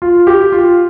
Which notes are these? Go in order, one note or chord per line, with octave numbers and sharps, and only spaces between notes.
F4
G4
F4